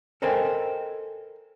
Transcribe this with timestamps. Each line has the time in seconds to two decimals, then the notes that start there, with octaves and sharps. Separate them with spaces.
0.22 A4 A#4 C5 D#5 G5 G#5